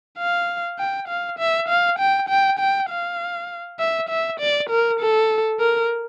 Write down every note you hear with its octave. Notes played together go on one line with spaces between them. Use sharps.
F5
G5
F5
E5
F5
G5
G5
G5
F5
E5
E5
D5
A#4
A4
A#4